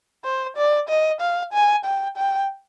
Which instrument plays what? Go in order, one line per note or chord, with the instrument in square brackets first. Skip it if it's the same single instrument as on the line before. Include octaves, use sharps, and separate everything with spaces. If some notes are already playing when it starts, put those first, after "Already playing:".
[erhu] C5
D5
D#5
F5
G#5
G5
G5